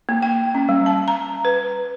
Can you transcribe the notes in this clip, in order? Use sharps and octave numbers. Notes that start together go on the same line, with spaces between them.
A#3
G5
C#4
G3
A5
A#5
B4